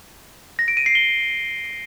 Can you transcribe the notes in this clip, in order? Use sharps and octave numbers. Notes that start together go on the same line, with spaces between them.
A#6
D7
D#7
C7
G7